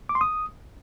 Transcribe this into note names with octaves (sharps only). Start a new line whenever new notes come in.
D6
C6
D#6